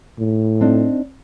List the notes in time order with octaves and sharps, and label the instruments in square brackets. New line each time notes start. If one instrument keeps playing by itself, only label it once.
[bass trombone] A2
[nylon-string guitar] C4 D4 D#4